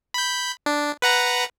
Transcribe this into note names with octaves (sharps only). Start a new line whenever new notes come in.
B5 G6
D4
B4 F#5 A#5